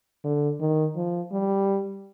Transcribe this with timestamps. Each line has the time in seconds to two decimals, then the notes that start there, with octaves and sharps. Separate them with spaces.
0.24 D3
0.60 D#3
0.96 F3
1.32 G3